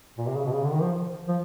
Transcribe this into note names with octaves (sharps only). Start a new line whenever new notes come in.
A#2
C3
C#3
B2
C#3
D3
D#3
F3
F3